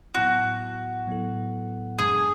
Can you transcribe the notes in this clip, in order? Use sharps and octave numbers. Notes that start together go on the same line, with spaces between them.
A2 F#3 B3 E4 F#4
A2 F#3 B3 E4 A4
F#2 D3 G#3 D4 G#4